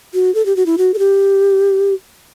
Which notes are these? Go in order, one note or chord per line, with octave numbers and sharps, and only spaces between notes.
F#4
A4
G4
F#4
E4
F#4
A4
G4